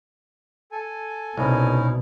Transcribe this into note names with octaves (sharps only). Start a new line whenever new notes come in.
A4 G#5
C2 B2 C#4 D#4 E4